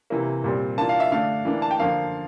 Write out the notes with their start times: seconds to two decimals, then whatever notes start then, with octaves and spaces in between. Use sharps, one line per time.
0.10 C3 E3 A#3
0.44 A#2 G3 C4
0.78 E3 A#3 D4 F4 A5
0.89 F5
1.00 E5
1.12 D3 A3 D4 F5
1.45 E3 A#3 D4
1.62 A5
1.71 G5
1.80 D3 F3 A#3 D4 F4 F5